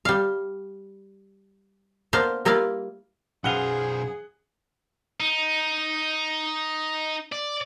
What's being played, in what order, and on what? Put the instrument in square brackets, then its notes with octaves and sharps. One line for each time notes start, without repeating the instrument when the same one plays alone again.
[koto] G3 F5
A#3 B3 D4 C5 F5
G3 A#3 E4 F4 F5
[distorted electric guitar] B1 C5 [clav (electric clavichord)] F#2 B4 F5 [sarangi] G#4 [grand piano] F#5 G7
[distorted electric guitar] D#4
D5